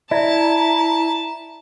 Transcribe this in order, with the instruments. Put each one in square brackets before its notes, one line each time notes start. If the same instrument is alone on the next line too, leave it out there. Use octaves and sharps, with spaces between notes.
[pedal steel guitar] E4 [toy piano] D5 E5 [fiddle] A5 [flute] A#5